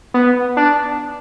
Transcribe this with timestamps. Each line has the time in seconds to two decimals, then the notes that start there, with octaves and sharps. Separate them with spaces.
0.14 B3
0.57 D4